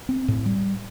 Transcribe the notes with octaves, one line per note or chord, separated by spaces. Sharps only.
C4
A2
G3